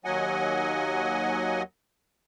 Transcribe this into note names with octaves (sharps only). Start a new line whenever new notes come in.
D#2 F#3 D#5 F#5 G#5